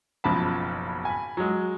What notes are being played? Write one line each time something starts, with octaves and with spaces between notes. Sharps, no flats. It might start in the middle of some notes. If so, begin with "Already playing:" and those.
F#1 B1 C#3 F3 A5 B5
G#5 B5
F#3 G#3